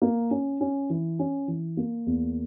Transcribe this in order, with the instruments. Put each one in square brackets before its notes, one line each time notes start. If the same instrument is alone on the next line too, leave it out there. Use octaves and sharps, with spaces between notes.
[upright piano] A#3
C#4
C#4
E3
C#4
E3
A#3
E2